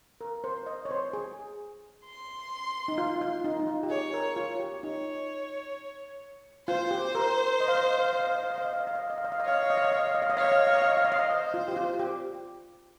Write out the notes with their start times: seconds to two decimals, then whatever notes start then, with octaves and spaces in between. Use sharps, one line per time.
0.21 A#4
0.44 C5
0.66 D#5
0.85 C#5
0.91 C5
1.13 G#4
2.05 C6
2.88 D#4
2.98 F4
3.21 F4
3.44 D#4
3.59 D#4
3.67 F4
3.83 G4
3.90 G#4 C#5
4.14 A#4
4.36 F4
4.60 G4
4.82 D#4 C#5
6.67 F4 C5
6.91 G4
7.15 A#4
7.60 D#5
7.68 F5
7.75 D#5
7.83 F5
7.91 D#5
7.98 F5
8.05 D#5
8.13 F5
8.20 D#5
8.27 F5
8.35 D#5
8.43 F5
8.50 D#5
8.58 F5
8.65 D#5
8.73 F5
8.80 D#5
8.87 F5
8.95 D#5
9.03 F5
9.10 D#5
9.18 F5
9.24 D#5
9.32 F5
9.40 D#5
9.45 C#5 F5
9.54 D#5
9.63 F5
9.70 D#5
9.78 F5
9.84 D#5
9.92 F5
10.00 D#5
10.07 F5
10.15 D#5
10.22 F5
10.30 D#5
10.37 C#5 F5
10.44 D#5
10.52 F5
10.60 D#5
10.67 F5
10.74 D#5
10.82 F5
10.90 D#5
10.97 F5
11.05 D#5
11.12 F5
11.19 D#5
11.30 C5 D#5
11.54 F4
11.68 G4
11.77 F4
11.99 G4